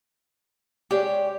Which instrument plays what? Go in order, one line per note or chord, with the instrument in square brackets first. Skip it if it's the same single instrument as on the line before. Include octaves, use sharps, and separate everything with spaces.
[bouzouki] G#3 D4 C#5 [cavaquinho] G4